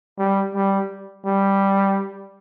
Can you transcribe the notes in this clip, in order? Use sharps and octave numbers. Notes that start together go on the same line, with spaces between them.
G3
G3
G3